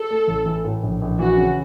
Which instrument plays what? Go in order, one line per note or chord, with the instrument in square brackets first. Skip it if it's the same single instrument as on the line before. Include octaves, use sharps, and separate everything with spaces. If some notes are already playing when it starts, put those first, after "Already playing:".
Already playing: [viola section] A4
[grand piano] A3
A1
E3
A2
A#1
A#1
[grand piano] E3 [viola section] F#4
[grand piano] C#3